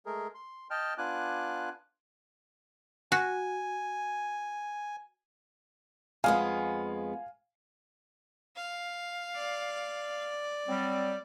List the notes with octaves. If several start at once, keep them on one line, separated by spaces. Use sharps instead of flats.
G#3 A3 G#4 A#4
C6
D#5 G5 A5 F6
B3 D4 F4 G#5 D6 F#6
F#4 G#5
F2 G#3 B3 F5 G#5 F6
F5
D5
F#3 G3 C4